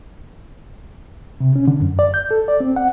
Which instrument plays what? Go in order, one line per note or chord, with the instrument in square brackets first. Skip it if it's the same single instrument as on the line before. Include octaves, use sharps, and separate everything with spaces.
[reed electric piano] C3
C#4
D3
F#2
D5
G6
A4
D5
C4
F#5